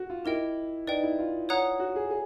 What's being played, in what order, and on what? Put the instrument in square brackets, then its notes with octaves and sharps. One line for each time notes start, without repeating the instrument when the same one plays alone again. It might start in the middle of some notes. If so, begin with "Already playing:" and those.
Already playing: [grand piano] F#4
F4
[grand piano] E4 [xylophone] G4 A#4 D#5 G5
[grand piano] D#4 [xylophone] B4 D5 G5
[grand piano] E4
F4
[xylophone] C#5 F#5 A#5 D#6 F#6
[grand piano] F#4
G#4
G#4